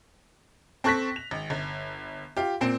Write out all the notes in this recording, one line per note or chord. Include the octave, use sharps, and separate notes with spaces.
C4 A4 C#6 F#6 A#6 B6
F7
G#1
G1
F4 G4
A#2 C4 D7